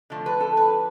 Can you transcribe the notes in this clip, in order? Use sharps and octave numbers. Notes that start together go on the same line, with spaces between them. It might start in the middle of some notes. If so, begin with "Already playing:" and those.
D3 F3 A3
B4
A4
B4